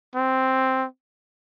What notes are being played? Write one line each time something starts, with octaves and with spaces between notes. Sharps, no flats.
C4